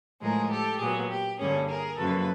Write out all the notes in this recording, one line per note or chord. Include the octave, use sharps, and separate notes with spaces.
A2 F3 G#3 G#4 A#4
G4 A4
A#2 F#3 B3 G#4
G4
G2 D3 G3 A#3 C#4 G#4
G#4 A#4
F#2 C#3 F3 A#3 A4 B4